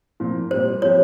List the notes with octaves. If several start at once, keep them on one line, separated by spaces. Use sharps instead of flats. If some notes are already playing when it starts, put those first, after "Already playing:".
A#2 F3 C4
A#2 G3 C4 G4 C5
F3 C4 G4 C#5